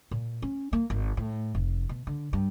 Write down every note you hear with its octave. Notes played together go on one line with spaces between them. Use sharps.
A#2
C#4
A#3
G#1
A2
F1
B2
D3
G2